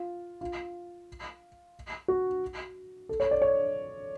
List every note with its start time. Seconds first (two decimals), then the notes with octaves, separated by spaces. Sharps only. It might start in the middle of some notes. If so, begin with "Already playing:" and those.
Already playing: F4
0.41 F4
2.08 F#4
3.09 A4
3.20 C#5
3.31 D5
3.42 C#5